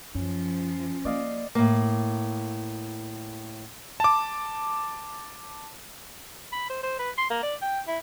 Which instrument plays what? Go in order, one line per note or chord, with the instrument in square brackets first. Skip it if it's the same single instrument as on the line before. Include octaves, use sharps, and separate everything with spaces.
[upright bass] F#2 [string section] F3 [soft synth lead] C#4
[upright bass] A#3 [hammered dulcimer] D5 D#5 F5
[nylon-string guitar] A2 A#3
[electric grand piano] A5 D6
[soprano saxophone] B5
C5
C5
B4
C6
A#3
D5
G5
E4